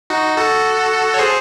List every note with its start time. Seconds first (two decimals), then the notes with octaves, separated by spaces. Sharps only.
0.10 D#4 F#4
0.37 F#4 A4
1.14 C#5
1.19 G#4 C5